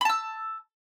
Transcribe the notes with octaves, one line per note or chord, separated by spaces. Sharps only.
A5 B5 E6